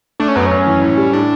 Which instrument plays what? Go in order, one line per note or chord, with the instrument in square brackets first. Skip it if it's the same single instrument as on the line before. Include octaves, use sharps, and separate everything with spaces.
[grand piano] A3 [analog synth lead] D4
[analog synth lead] C#4
[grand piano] F#2 [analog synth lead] B3
[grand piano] F#2 [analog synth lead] C#4
[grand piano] E3
A2
G3
[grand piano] A2 [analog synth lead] D4